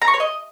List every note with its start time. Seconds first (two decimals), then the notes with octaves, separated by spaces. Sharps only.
0.02 A#5
0.08 C#6
0.14 C#5
0.20 D#5